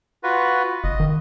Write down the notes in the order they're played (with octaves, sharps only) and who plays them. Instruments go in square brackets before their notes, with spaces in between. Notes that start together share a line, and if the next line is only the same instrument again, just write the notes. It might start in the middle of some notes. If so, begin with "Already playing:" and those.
[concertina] F4 F#4 B4
[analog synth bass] F#1 [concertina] D#5
[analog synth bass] D#3